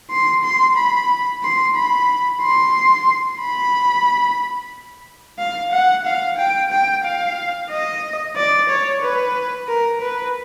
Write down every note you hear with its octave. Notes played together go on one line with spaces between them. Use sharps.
C6
C6
B5
C6
B5
C6
B5
F5
F#5
F5
G5
G5
F5
D#5
D5
C#5
B4
A#4
B4